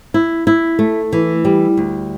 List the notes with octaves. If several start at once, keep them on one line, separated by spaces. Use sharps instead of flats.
E4
E4
A3
E3
G3
D2